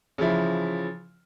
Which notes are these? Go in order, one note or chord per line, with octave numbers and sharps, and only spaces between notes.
C#3 E3 F3 E4